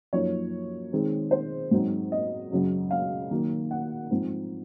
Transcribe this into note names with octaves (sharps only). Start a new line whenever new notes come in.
F#2 F3 A#3 D#4 C#5
D#3 G#3 C4 D#4
C5
G#2 F#3 C4 D#4
D#5
F#2 C#3 F#3 C#4
F5
D#3 F#3 A#3
F#5
G#2 F3 C4 D#4